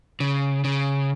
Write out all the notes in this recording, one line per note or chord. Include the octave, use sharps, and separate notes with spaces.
C#3
C#3